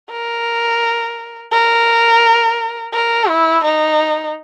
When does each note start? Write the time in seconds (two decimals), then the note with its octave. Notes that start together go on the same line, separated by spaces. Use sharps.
0.11 A#4
1.52 A#4
2.94 A#4
3.28 E4
3.64 D#4